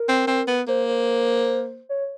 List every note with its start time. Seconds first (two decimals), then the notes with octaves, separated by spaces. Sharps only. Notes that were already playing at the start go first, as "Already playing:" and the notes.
Already playing: A#4
0.08 C4
0.27 C4
0.48 B3
0.68 A#3 C5
0.89 C5
1.89 C#5